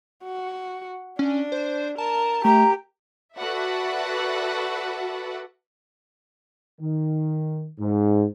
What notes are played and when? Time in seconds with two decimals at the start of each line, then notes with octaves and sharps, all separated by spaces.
0.24 F#4
1.19 C#4 D4
1.52 C5
1.98 A#4 A5
2.45 A3 G4 A#5
3.37 F#4 A4 B4 D5 E5 F#5
6.80 D#3
7.79 G#2